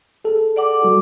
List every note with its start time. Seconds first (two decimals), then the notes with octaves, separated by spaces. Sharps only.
0.25 G#4 A4
0.56 D5 F#5 D6
0.82 G3 F#4 A4